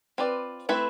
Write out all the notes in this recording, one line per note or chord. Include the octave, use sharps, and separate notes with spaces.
C4 F4 B4 D5
A3 C4 E4 B4